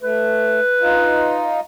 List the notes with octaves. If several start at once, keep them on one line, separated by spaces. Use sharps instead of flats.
A3 B4
D#4 F4